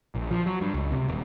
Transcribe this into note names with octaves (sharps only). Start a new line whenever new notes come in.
A#1
F3
F#3
G2
C#2
C3
D#1